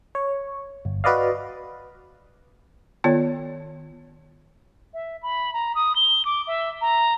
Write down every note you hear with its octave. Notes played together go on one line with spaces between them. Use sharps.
C#5
G1
F#4 B4 D5 D#5 F5
D#3 B3 F4 C#5 D5
E5
B5
A#5
D#6
G7
D6
E5
A#5